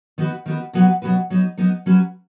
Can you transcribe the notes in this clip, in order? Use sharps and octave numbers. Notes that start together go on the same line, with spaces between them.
D#3 B3 F#4 B4
D#3 B3 F#4 B4
B2 F#3 B3 F#4 B4
B2 F#3 B3 F#4 B4
F#3 B3 D#4
F#3 B3 D#4
F#3 C#4 F#4 B4